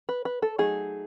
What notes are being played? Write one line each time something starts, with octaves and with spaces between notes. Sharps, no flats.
B4
B4
A4
F#3 A3 D#4 G#4